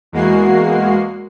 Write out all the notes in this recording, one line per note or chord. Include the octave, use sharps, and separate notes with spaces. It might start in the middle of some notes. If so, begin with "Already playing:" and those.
E2 G#3 A#3 F#4 C7